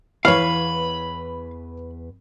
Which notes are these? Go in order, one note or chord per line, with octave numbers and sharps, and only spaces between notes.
E2 E3 B4 C#5 F5 B5